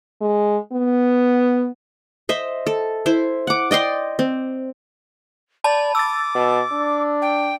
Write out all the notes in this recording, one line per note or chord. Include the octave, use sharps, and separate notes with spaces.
G#3
B3
C5 D#5 E5
A4
E4 C5
F#5 D6
D5 D#5 G5 C6
C4
D5 A5 B5
D6 E6 A6
B2
D4
G5